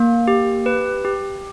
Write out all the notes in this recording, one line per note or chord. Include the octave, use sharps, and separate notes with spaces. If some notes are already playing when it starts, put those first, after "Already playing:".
Already playing: A#3
G4
B4
G4